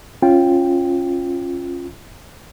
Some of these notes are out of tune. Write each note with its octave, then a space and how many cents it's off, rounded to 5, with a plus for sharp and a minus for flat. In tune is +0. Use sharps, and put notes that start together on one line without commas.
C#4 -20 F4 +0 G5 +0